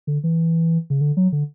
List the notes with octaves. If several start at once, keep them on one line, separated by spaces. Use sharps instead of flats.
D3
E3
C#3
D3
F#3
D3